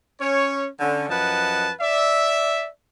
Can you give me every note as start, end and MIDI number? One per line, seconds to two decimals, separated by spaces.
0.21 0.68 61
0.21 0.68 73
0.80 1.08 50
0.80 1.08 61
1.09 1.72 42
1.09 1.72 53
1.09 1.72 71
1.09 1.72 75
1.09 1.72 78
1.09 1.72 81
1.81 2.67 74
1.81 2.67 76